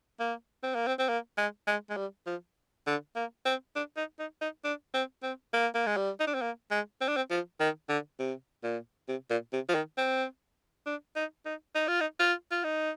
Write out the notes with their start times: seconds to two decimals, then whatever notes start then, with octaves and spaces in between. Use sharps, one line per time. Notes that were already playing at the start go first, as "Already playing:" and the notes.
0.20 A#3
0.64 C4
0.75 A#3
0.87 C4
0.99 C4
1.09 A#3
1.38 G#3
1.67 G#3
1.90 G#3
1.97 G3
2.27 F3
2.87 D3
3.16 A#3
3.46 C4
3.76 D4
3.97 D#4
4.19 D#4
4.41 D#4
4.64 D4
4.94 C4
5.23 C4
5.53 A#3
5.75 A#3
5.86 G#3
5.97 G3
6.20 D#4
6.27 D4
6.35 C4
6.42 A#3
6.71 G#3
7.01 C4
7.08 D4
7.17 C4
7.31 F3
7.60 D#3
7.89 D3
8.20 C3
8.64 A#2
9.09 C3
9.30 A#2
9.53 C3
9.69 F3
9.75 D#3
9.98 C4
10.86 D4
11.16 D#4
11.46 D#4
11.75 D#4
11.88 F4
12.01 D#4
12.20 F4
12.51 F4
12.64 D#4